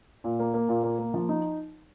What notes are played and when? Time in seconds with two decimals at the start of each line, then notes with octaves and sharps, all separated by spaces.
0.24 A#2
0.39 A#3
0.54 A#3
0.69 A#2
0.83 A#3
0.99 A#3
1.14 F3
1.29 D#4